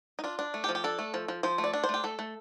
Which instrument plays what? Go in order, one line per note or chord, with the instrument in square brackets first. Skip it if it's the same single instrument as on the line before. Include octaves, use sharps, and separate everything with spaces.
[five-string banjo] D#4
D4 F4
D4
A3
G4
F3
G4
D4 A4
A3
F3
F3
F3 C5
A3
D5
D4
C5
A3
G4
A3 A4
A3